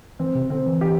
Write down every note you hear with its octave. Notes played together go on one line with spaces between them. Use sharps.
E3 C4
C3
D3 C4
E3
G4